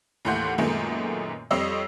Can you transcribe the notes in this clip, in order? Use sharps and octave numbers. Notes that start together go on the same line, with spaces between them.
D#2 A2 E3 F#5 C6 G6
F#2 A#2 D#3 G#3 A3 B3
F2 G3 C4 C#5 D#5 E6